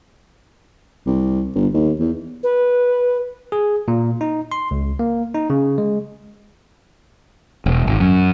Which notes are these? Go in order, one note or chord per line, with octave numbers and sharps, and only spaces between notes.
C2
G1
D#2
E2
B4
G#4
A#2
D#4
C6
C#2
A#3
D#4
C#3
G#3
E1
G#1
F#2